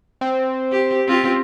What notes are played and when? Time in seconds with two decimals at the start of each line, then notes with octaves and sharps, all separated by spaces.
0.21 C4
0.72 G4
1.07 C4 F4 G4